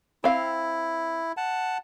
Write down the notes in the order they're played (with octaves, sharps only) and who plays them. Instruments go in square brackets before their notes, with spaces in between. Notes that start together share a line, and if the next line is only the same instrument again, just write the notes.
[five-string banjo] C4 F5 [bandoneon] E4
[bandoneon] F#5 A5